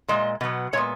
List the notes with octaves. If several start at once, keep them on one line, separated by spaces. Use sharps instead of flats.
A#2 G#3 D#5
B2 F#3 B3
A#2 G#3 B3 C#5